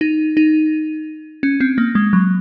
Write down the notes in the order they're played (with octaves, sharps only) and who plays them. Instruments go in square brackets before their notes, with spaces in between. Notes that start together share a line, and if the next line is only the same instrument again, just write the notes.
[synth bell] D#4
D#4
C#4
C4
A#3
G#3
F#3